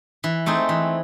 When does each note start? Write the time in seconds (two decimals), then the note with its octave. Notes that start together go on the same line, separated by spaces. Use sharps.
0.24 E3
0.46 A3 C4 D#4 G#4
0.69 E3